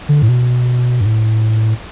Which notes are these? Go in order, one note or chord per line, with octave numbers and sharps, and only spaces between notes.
D3
A2
B2
G2
A2